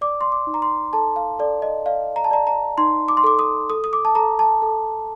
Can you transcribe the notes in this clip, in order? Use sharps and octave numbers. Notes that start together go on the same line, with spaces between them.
D5 D6
C6
D6
D#4
A#5
C6
A4 A5
F5
A4 D5
D#5
D5 F5
A#5
A5
D5 A#5
A#5
D#4 C6
D6
C6
A4 D6
D#6
A4 D#6
D#6
D6
A5
A4 A#5
A5
A4